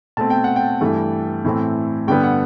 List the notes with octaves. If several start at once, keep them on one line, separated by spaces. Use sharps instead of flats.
B2 A3 C4 A5
G5
F#5
G5
G2 E3 A3
A2 E3 A3 C4
G2 D3 G3 B3 G5
F#5